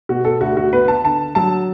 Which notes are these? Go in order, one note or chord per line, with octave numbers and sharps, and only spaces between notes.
B2 F#4
A4
D2 F#4
F#4
B3 B4
A5
D3 A5
F#3 A5